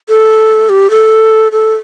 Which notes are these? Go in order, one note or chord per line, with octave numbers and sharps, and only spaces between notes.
A4
G4
A4
A4